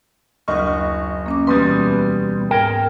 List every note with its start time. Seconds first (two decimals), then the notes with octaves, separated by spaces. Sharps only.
0.48 F#1 D2 D#5 F#5 C#6 F6
1.26 A#3 C#4 D6
1.47 E2 B2 G3 B4 C6 D#6
2.51 G#2 A#4 G5 G#6